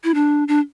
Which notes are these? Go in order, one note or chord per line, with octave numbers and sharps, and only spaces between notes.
E4
D4
D4